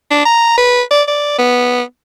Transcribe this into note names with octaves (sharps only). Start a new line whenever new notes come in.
D4
A#5
B4
D5
D5
B3